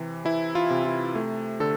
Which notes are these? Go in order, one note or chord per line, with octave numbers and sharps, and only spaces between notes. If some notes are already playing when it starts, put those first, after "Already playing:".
Already playing: C3 E3
E3 E4
F4
C3
F4
A3
D3 A4